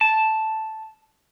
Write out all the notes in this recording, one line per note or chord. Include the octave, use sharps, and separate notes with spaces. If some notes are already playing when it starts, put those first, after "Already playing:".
A5